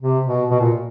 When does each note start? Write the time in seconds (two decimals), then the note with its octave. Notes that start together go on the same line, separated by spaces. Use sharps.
0.02 C3
0.26 B2
0.50 B2
0.60 A#2